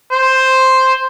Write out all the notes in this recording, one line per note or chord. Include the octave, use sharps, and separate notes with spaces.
C5